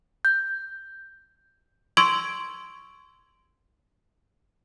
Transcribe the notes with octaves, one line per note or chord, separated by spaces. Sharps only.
G6
C6 C#6 E6 G#6 D7 F#7